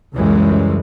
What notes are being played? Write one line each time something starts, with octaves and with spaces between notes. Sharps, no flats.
C#2 F#2 E3 G3 G#3